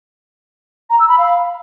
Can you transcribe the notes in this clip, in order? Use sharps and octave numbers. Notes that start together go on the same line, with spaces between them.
A#5
E6
B5
F5